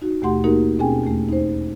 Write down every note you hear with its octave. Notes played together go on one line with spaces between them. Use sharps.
D#4 F#4
D#2 B2 A3 G4 F#5 C6
A#3 D#4 F#4 G4 A#4
B2 C4 C#4 G#4 G5 G#5
E2 A3
D#4 C5